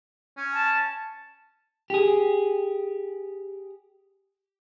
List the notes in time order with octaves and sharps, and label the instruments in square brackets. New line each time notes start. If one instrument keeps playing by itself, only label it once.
[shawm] C#4
[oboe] A5
[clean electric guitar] G4 G#4